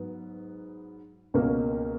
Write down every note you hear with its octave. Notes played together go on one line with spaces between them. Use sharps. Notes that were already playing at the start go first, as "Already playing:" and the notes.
Already playing: G#2 F#3 B3
C#2 B2 A#3 C#4